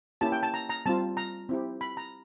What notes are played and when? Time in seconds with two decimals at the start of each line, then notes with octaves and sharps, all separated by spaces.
0.21 A#3 C#4 E4 G4 A5
0.32 G5
0.43 A5
0.54 A#5
0.70 A#5
0.86 G3 C4 F4 A5
1.17 A#5
1.49 C4 E4 G4
1.81 B5
1.97 A#5